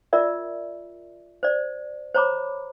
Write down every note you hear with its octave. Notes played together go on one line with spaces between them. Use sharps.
F4 A#4 D5 E5
C5 D5
C5 C#5 A#5 B5 D6